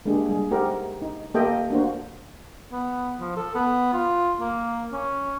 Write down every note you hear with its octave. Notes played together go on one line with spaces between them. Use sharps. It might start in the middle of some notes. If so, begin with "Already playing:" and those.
G#3 A#3 D4 G4 G#4
G3 G#4
A3 D#4 G4 A#4 C5 F#5
D#4
A#3 G4 A4 D#5 E5 G5
A#3 D4 F#4 C5
B3
F3
A4
B3
F4
A#3
C#4